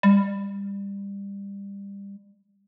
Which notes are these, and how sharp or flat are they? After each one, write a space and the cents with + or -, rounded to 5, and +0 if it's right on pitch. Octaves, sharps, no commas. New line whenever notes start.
G3 +25